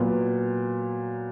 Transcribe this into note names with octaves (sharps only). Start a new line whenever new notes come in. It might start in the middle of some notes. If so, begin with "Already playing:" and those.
Already playing: A#2 F#3 B3